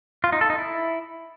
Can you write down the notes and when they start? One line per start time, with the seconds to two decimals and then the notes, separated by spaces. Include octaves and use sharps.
0.24 F4
0.32 D#4
0.41 A4
0.50 D#4
0.58 E4